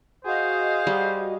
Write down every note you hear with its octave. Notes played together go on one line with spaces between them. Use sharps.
F#4 G#4 C5 D#5 F5
G3